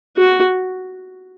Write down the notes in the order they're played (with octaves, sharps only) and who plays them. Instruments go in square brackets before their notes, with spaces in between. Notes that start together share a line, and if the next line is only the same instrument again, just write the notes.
[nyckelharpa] F#4